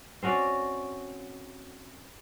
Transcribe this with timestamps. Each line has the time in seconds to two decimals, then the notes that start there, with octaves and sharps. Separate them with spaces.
0.22 C4 C#4 F#4 D5